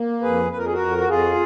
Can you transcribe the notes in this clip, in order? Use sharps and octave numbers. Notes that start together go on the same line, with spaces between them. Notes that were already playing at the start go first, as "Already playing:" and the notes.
Already playing: A#3
F2 G#4 B4
F2 B4
A#4
G#4
F#4 A#4
F2
F#4
F2 F4 G#4